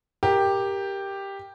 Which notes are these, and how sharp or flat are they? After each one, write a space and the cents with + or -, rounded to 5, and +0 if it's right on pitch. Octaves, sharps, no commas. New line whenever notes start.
G4 +5 A#4 +0